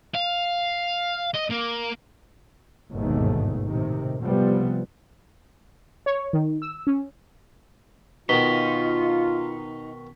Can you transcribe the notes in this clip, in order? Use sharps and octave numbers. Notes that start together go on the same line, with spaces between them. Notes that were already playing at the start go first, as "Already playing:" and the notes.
F5
D#5
A#3
G1 D#2 G#2 B2 D#3 A3
A2 C3 D#3
C3 F3 G3 B3
C#5
D#3
E6
C#4
B2 D#3 D#4 F4 B6 G7